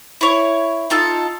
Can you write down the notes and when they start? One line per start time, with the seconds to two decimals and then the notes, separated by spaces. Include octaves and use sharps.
0.21 E4 C#5
0.90 D#4 F4 A4